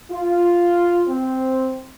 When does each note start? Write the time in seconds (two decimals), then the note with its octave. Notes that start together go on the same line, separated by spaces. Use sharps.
0.11 F4
1.08 C4